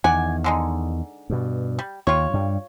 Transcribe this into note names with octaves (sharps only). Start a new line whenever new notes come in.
E2 D#3 D5 F#5 G#5
D3 G#3 D#4
G2 B2
G3
D#2 F4 C#5
G2 G3